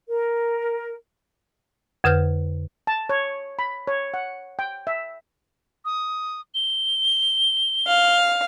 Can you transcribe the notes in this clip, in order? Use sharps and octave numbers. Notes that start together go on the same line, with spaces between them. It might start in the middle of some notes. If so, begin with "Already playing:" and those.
A#4
F2 D3 B4 F6 G6
A5
C#5
B5
C#5
F#5
G5
E5
D#6
G7
F5